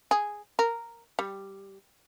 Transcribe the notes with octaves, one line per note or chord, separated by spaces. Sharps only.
G#4
A#4
G3